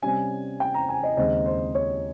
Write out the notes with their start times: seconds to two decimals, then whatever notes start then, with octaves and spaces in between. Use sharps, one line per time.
0.02 C3 G3 C#4 G#5
0.60 G5
0.74 A#5
0.89 G#5
1.03 D#5
1.17 D#2 C#3 G#3 C4 D#5
1.46 C5
1.75 C#5